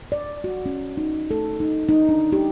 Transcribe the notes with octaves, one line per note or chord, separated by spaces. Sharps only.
D5
F#4
C#4
D#4
A4
D#4
D#4
D4
G4